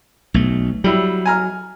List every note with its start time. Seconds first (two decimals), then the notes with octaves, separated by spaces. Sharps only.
0.34 B1 A3
0.84 F#3 G3 E4
1.26 G#5 A#5 F6